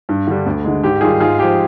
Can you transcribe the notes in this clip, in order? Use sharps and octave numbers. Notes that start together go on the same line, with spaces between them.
G2
D3 G3
D2
D3 G#3
G#2 G4
D#3 G3 F4 G#4
G#2 F4 G#4
F3 G#3 G4